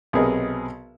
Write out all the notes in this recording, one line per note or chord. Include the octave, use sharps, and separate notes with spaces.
B1 C3 B3 G#4 A#4 D#5